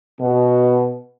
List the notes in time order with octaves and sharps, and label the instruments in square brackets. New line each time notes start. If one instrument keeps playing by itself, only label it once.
[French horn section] B2